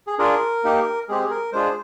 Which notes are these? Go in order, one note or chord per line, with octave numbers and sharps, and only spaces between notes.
G#4
D4 F4 G#4 A#4
A#3 D#4 G4
G#3 C4 G4 G#4
G#4
A#4
G#3 D4 F4 G#4 C5